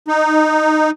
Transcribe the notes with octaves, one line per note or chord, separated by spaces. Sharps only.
D#4